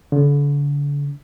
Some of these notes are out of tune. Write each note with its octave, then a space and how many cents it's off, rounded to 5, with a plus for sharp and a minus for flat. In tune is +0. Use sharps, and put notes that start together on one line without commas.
D3 -40